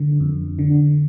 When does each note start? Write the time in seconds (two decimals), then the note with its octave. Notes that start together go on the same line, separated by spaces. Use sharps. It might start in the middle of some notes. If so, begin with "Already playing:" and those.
Already playing: D3
0.20 F2
0.59 D3